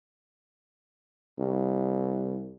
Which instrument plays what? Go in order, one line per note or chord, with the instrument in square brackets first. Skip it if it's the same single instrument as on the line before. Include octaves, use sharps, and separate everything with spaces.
[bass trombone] C2